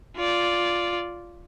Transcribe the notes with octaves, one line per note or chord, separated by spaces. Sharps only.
F4 D5